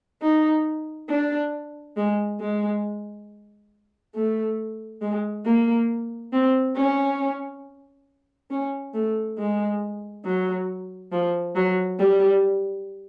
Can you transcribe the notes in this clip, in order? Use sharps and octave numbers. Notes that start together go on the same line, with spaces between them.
D#4
D4
G#3
G#3
A3
G#3
A#3
C4
C#4
C#4
A3
G#3
F#3
F3
F#3
G3